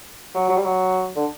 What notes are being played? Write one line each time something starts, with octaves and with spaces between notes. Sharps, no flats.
F#3
F#3
G3
F#3
D3